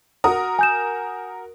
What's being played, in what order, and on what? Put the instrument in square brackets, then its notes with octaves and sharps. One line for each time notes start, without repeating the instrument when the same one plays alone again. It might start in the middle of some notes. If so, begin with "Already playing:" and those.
[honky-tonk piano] F#4 A#4 D#6
[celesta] G#5 G6 E7